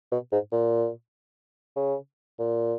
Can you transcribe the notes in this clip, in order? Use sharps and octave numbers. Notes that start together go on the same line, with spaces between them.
B2
G#2
A#2
C#3
A#2